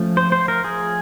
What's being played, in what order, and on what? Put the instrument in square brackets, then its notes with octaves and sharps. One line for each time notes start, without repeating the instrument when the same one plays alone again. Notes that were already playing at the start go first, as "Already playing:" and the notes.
Already playing: [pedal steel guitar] F3 A3 C#4
C5
C5
A#4
G#4